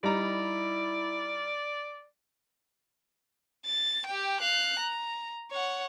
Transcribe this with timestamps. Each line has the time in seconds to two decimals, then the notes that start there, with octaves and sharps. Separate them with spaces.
0.03 G3 D#4 E4 D5 A#5
3.66 A6
4.06 G4 G5
4.41 F5 F#6
4.79 A#5
5.51 C#5 F#5